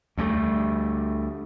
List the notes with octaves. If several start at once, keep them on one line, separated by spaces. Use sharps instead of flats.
D2 G3 A3